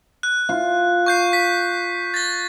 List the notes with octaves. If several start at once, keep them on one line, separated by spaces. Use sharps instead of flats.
F#6
F4
C#6 G6 C7
B6
A6 A#6